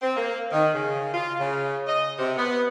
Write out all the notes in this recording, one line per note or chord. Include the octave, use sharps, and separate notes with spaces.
C4
A#3
D#3
C#3
F4
C#3
D#5
C3
B3